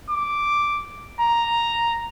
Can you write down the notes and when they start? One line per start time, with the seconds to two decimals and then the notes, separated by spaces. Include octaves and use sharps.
0.10 D6
1.20 A#5